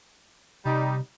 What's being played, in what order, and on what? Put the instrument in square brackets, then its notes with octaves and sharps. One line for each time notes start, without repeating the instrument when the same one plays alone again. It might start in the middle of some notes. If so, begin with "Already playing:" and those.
[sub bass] C3 [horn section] G3 D#4